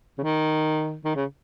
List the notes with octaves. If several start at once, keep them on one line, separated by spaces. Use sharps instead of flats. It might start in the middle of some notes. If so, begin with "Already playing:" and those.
C#3
D#3
D#3
C#3